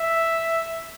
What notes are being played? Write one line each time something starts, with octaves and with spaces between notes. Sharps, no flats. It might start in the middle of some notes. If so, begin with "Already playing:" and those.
Already playing: E5